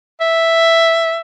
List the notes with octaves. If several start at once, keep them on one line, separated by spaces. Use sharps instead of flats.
E5